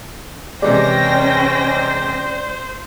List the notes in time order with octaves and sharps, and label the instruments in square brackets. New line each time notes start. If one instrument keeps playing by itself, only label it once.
[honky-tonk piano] C3 E3 G#3 [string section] C#4 G5 A#6 [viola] C5 [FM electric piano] D5